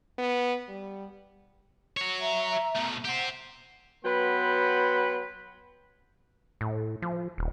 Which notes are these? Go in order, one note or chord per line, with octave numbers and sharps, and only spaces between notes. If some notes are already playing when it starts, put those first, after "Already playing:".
B3
G3
F#4 C#5
E5 A#5
B2 A3
G4 C5 F#5
F#3 B3 B4 G5 B5 C6
A2
F3
D#1